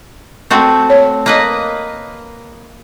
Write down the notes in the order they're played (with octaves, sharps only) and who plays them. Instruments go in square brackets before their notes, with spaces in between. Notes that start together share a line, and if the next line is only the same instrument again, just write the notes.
[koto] A3 C4 F#4
[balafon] C#5
[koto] A#3 B4 D#5